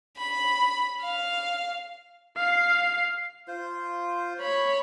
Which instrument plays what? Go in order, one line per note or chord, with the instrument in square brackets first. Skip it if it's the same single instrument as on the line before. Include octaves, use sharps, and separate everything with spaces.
[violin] B5
F5
[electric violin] F5 C7
[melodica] F4 C5
[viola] C#5 B5